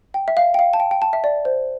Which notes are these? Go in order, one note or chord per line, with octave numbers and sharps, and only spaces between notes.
G5
E5
F5
G5
F5
A5
G5
G5
A5
E5
D5
C5